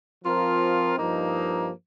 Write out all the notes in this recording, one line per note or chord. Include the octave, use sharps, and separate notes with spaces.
F3 C4 F4 A#4
G2 F3 A#3 D#4